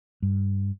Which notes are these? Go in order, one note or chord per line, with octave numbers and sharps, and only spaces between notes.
G2